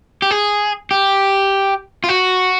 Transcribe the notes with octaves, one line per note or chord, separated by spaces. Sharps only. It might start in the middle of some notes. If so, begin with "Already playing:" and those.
G4
G#4
G4
F4
F#4